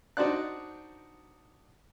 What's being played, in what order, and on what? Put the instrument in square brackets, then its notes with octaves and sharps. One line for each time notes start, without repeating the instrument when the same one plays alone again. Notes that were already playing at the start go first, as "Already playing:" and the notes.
[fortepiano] D4 D#4 F#4 C5 D5 F#6